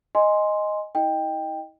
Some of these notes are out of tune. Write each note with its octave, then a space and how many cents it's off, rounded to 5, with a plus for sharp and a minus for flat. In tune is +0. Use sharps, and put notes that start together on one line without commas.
D#5 +0 G#5 +0 C6 +0
E4 -45 D#5 +0 G5 +10